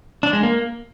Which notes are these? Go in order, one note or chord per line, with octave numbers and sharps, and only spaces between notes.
D4
G#3
A#3